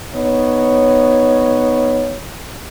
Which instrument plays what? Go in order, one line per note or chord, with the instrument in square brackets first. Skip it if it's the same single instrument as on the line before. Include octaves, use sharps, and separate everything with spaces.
[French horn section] B3 D#4 C#5